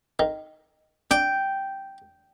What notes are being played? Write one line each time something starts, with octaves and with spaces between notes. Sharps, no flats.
D#3
D4 G5